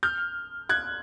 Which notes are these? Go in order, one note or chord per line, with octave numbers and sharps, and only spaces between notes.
F6 G6
F#6 G#6